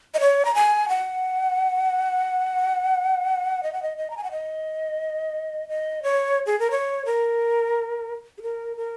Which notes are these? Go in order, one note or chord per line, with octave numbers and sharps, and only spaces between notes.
D#5
C#5
A#5
G#5
F#5
D#5
F#5
D#5
D#5
A#5
G#5
F#5
D#5
D#5
C#5
G#4
A#4
C#5
A#4
G#4
A#4
A#4